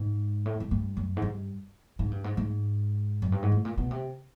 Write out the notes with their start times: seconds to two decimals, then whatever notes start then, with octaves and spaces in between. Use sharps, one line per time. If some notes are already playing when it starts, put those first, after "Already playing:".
Already playing: G#2
0.46 A2
0.60 G#2
0.71 G2
0.97 F#2
1.17 G#2
1.22 G2
1.99 G#2
2.11 G2
2.24 G#2
2.37 G#2
3.22 F#2
3.32 G2
3.43 G#2
3.52 A2
3.65 A#2
3.78 B2
3.91 C3